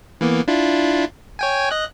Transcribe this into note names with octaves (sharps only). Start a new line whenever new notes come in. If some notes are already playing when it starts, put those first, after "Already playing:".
E3 A#3 B3
D4 E4 F4
C#5 G5 G#5
D#5 F#6